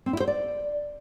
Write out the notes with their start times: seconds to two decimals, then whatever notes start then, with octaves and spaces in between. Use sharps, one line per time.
0.06 C4
0.13 E4
0.20 C5
0.28 D5